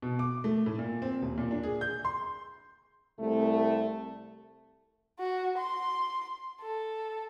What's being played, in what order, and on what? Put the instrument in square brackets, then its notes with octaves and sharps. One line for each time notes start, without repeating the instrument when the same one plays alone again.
[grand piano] B2
D6
A3
A2
A#2
C4
D#1
A#2
D4
G#4
G6
C6
[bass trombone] C2 [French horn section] A3
[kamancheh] F#4
C6
A4